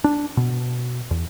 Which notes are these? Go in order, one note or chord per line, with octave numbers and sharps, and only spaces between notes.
D4
B2
E2